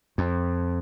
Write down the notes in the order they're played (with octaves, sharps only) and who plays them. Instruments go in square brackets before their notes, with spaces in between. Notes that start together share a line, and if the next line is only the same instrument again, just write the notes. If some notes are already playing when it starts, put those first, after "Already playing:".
[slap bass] F2